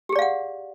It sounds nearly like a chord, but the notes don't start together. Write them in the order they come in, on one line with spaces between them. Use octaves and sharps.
G4 G#4 D5 F5 F#5